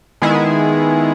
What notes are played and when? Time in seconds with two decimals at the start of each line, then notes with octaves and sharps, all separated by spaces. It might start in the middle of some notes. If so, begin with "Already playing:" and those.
0.22 D#3 G#3 B3 E4 G#4